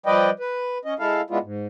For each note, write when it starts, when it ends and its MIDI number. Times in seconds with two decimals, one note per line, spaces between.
0.06 0.30 53
0.06 0.30 55
0.06 0.30 71
0.06 0.30 74
0.06 0.30 75
0.06 0.30 79
0.40 0.78 71
0.85 0.94 61
0.85 0.94 75
0.99 1.21 56
0.99 1.21 64
0.99 1.21 69
0.99 1.21 77
1.30 1.38 56
1.30 1.38 59
1.30 1.38 62
1.30 1.38 64
1.30 1.38 65
1.42 1.67 44